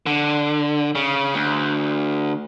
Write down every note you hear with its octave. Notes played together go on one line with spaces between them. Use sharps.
D3
C#3
D2